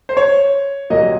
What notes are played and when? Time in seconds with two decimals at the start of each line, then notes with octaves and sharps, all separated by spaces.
0.09 C5
0.17 C#5
0.90 C2 A#2 F#3 A#3 D#5